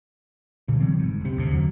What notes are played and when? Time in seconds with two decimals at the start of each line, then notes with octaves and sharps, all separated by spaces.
0.68 G2 A#2 D3
0.80 C3 E3 F#3 C4
0.99 G1 G#2
1.21 F#1 C3
1.37 E1 D2 C3
1.53 E2 D3 F#3